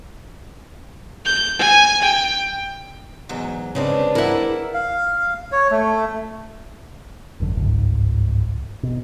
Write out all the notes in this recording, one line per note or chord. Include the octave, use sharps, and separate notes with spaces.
G6
G#5
G5
E2 G#2 F#3
F2 C#3 G#3 C4 D4 B4
E4 A#4 E5 F#5
F5
C#5
A3
G1 F#2 D3
G1 C#2 G#2
B2